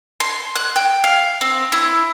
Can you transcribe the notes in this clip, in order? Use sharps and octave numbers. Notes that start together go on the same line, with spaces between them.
C6
F#6
G5
F5
C4
E4